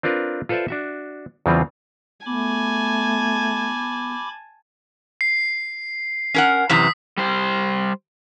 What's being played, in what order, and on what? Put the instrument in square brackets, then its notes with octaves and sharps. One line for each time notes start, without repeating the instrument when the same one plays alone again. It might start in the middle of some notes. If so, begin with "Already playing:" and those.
[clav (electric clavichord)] C4 D4 F4 A#4 B4
F4 A4 B4 C5 D5 E5
D4 F#4 E5
E2 C#3 E3 G3 C4 F4
[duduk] A3 [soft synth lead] B3 [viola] G#5 A5 [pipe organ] B5 D6
[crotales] C7
[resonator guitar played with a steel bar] C#4 A#4 F#5
[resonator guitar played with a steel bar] F#2 C3 E3 [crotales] D#6 B6
[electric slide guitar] G3 C5